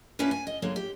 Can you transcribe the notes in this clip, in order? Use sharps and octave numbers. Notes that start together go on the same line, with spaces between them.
A#3 C#4 D4 E4 B4
G#5
D#5
D3 F#3 G#3 A#3
G4